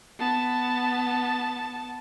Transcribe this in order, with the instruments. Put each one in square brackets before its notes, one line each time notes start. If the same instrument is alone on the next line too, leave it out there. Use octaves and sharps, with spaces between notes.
[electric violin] B3 A5